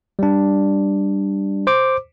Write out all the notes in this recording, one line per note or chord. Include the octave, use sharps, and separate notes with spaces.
G3 D4
C5 D6